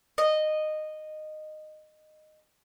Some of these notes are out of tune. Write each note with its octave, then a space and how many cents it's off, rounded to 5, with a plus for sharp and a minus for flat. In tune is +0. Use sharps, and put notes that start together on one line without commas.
D#5 -15